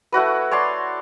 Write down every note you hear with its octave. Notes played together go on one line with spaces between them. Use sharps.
A3 E4 F#4 B4
C#5 D5 A5 C6